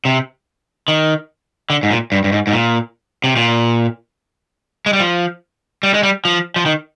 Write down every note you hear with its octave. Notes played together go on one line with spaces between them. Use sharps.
C3
D#3
D3
G#2
A#2
G2
G2
G#2
G#2
A#2
C3
A#2
G#3
G3
F3
G3
G#3
G3
F3
F3
D#3